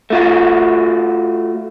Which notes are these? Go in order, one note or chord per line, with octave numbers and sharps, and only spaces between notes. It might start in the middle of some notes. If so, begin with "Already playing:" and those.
A3 F4 F#4